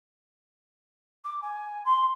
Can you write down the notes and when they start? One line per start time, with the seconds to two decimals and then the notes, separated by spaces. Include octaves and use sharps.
1.24 D6
1.41 G#5
1.85 C6